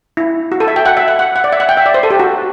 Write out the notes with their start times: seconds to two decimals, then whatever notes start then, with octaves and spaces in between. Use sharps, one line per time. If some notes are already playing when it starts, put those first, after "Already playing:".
0.17 E4
0.52 F#4
0.60 A4
0.68 E5
0.76 G5
0.86 F#5
0.97 E5
1.08 F#5
1.19 F#5
1.36 F#5
1.44 D5
1.53 E5
1.60 F#5
1.69 G5
1.77 E5
1.86 D5
1.94 C5
2.03 A4
2.11 G4
2.20 F#4